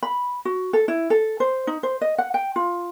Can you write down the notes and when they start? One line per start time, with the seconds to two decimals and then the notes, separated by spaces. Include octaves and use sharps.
0.03 B5
0.45 F#4
0.73 A4
0.88 E4
1.10 A4
1.40 C5
1.67 D#4
1.83 C5
2.01 D#5
2.18 F#5
2.34 G5
2.56 F4